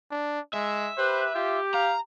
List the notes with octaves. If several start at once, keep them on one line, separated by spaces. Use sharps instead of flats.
D4
G#3 E5
G4 B4 C5
F4 G4
F5 A#5